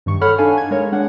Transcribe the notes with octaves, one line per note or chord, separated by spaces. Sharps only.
G2 D#3 C#6
A4 C#5 F#5 B5 F6
D4 D#4 A4 F5 G#5
G#6
G#3 A#4 C#5
G#3 D4 F#5